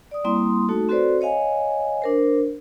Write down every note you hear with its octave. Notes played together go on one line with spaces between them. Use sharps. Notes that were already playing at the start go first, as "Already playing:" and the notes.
D5 D#6
G3 A#3 C4 E4 C6 D#6
A3 D#4 F#4 A4
C4 F#4 A4 B4 C5 D5
C#5 D#5 F5 G#5
D4 A#4 C5